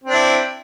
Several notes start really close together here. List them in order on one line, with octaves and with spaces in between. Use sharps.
C4 D4 E4